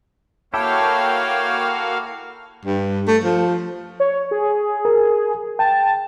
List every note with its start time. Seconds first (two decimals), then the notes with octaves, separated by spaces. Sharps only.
0.54 A#3 E4 F#4 G4 A4 C#5 F5 G5
2.66 G2
3.07 A3
3.24 F3
4.00 C#5
4.31 G#4
4.85 A#4
5.59 G5 A5